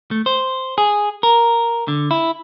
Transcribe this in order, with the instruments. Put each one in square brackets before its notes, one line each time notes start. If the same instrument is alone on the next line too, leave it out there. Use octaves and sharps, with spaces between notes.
[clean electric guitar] A3
C5
G#4
A#4
D3
E4